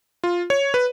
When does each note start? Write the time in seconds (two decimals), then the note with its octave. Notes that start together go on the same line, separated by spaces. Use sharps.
0.24 F4
0.50 C#5
0.74 B4